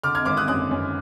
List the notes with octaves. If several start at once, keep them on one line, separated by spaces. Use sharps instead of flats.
D3 D6 F6
F6 G#6
G#1 D6 F6
D#6 F#6
F#2 D#6 F#6
F#2